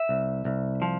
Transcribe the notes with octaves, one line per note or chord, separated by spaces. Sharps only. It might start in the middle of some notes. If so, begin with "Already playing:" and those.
Already playing: E5
C2
C2
F3